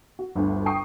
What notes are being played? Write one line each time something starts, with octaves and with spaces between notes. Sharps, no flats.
F#4
G1 D2
G5 A#5 C#6 D#6 C7